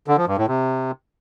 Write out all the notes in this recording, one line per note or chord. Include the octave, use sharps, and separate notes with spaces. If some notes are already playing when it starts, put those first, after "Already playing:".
D3
F3
G2
A2
C3